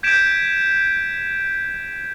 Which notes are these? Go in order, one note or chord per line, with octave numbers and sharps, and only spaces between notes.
G6 G#6 B6 D7 E7